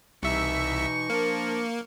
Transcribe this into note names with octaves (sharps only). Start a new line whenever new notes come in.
C2 B2 E3 D#4 E5 C#6
F3 A#3 D4 A#4